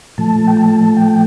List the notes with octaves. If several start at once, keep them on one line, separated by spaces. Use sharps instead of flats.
A#2 F3 A3 A5
G5
A5
G5